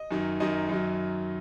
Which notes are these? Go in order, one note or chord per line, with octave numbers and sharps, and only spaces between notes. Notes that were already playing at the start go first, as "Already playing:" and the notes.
Already playing: D#5
F#2 D#3 F#3
F#2 D#3 F#3 D#5
F#2 D#3 F#3